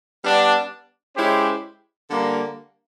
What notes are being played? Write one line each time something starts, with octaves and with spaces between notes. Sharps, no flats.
G3 B3 D4
G#3 C#4 E4 G4 C5
D3 G3 A#3